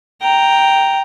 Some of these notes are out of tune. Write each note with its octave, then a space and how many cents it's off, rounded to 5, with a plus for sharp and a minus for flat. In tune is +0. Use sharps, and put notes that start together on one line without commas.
G5 +0 A#5 +0